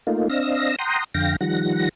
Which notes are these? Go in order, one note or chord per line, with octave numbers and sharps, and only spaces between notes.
A3 A#3 D#4 F4
C4 D4 D#5 F5 E6 A#6
F#5 G5 A#5 C6 D#6
F2 D3 F5 G5 A#6
D#3 F3 G3 F#5 A#6